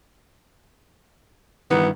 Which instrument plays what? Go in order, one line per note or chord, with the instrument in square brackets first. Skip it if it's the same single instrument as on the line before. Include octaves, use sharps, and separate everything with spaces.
[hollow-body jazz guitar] G2 D#3 E3 [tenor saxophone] B3